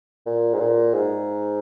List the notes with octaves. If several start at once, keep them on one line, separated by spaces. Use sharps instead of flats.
A#2
G#2
A#2
G#2